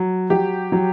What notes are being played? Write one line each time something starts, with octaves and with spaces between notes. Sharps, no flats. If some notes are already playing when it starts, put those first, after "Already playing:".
Already playing: F#3
F#3 G4
F#3